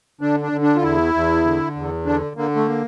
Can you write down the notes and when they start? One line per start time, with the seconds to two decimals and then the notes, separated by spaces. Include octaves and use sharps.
0.21 D3 D4
0.42 D4
0.52 D3
0.62 D4
0.76 F4
0.82 E2 E4
1.14 E2
1.45 D3
1.76 E2
2.05 D3 D4
2.36 D3 A#3
2.56 A3
2.68 A#3